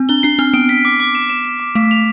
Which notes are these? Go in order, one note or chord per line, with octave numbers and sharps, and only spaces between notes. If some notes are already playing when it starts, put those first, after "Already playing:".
Already playing: C4
D4 G7
D4 C7
C4 F6
B3 D7
B6
D6
D6
E7
E7
E7
D6
A3 B6
F7